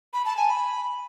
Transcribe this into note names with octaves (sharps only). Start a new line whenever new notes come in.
B5
A5
G#5
B5